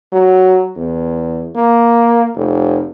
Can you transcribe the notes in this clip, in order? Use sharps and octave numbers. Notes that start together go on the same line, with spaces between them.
F#3
E2
A#3
F1